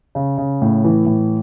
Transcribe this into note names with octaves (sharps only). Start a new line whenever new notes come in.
C#3
C#3
A2
E3
A2